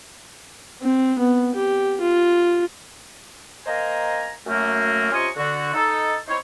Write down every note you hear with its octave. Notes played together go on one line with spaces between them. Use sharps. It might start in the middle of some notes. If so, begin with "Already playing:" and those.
C4
B3
G4
F4
A#3 C5 D#5 G#5 A#5
F#2 A3 A#3
C3 C#4 F4 D#5 G#5 C#6
D3 F#4
D#4 A4
C4 D#4 E4 C5 C#5